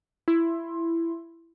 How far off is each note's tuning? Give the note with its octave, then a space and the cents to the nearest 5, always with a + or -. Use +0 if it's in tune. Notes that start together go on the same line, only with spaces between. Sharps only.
E4 +15 C6 +15